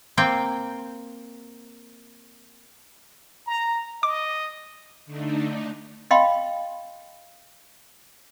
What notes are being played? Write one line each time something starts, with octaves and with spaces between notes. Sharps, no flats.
A#3 C4 G5
A#5
D#5 D6
D3 A3 D4 D#4
D#5 F5 G5 B5 C6